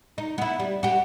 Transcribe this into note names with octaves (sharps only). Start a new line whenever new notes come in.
D#4
B3 E4
G3
F#4 G4